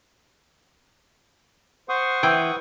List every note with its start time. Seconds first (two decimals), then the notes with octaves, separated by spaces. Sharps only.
1.89 C5 F#5 C#6 D#6
2.23 E3 G5